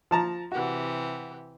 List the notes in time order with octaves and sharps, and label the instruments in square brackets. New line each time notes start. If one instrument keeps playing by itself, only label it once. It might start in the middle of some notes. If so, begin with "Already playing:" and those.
[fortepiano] F3 A5 A#5
[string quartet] C3 E3 G4 [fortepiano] F#4